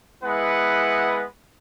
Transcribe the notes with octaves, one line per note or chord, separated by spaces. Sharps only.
G#3 B3 E4 B4 F#5